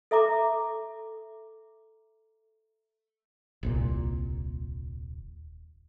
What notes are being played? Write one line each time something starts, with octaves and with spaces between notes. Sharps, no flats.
A4 E5 A#5 D6
D#1 C2 A#2